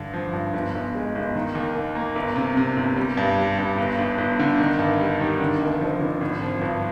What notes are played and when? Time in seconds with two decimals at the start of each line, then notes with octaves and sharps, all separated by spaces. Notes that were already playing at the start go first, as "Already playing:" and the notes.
Already playing: G2 D3
0.14 F3
0.33 G2
0.53 G1
0.75 G1
0.95 G#3
1.15 G1
1.35 D#3
1.55 D#2
1.75 D#2
1.95 A#3
2.16 G1
2.36 C3
2.57 C3
2.77 G1
2.96 G3
3.17 G2
3.38 G3
3.58 G2
3.78 G1
3.98 G1
4.18 G1
4.39 D3
4.59 D#3
4.79 G2
4.99 G3
5.20 D#3
5.40 D3
5.61 F1
5.81 F3
6.01 D3
6.21 G#1
6.42 F3
6.61 G2